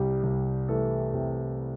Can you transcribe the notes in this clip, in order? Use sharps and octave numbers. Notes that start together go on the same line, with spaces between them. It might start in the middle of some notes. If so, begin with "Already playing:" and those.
Already playing: C2 G3 G4
C2
E3 A3 A4
C3